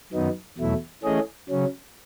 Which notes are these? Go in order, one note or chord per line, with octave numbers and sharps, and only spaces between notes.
F#2 D#3 F#3 B3 D#4
E2 B2 F#3 A3 E4
E3 A3 C#4 G#4 D#5
C#3 F#3 C#4